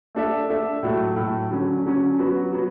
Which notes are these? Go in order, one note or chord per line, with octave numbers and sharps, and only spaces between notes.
A3 D4 A4 E5
A3 D4 A4 E5
A2 F#3 A3
A2 F#3 A3
D3 F#3 C#4
D3 F#3 C#4
F#3 B3 F#4
F#3 B3 F#4